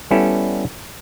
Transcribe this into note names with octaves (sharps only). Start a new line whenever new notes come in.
G3 B3 C#4 E4 A4